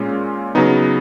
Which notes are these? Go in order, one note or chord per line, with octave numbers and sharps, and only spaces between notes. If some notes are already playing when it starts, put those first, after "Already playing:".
Already playing: A#2 G#3 C#4 F4
C#3 F#3 B3 D#4